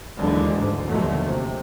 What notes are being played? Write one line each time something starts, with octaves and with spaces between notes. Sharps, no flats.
D#2 D3 E3 F#3 G#3
D2 G#2
D#2 B2 D3 F3 F#3 A3
C3